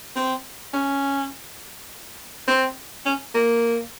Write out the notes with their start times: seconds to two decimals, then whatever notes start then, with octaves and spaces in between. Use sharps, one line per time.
0.16 C4
0.73 C#4
2.47 C4
3.05 C#4
3.35 A#3